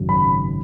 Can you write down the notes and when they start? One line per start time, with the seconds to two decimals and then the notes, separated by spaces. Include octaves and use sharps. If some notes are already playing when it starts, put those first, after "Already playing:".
Already playing: G#1 F#2 C#3 F#3
0.09 B5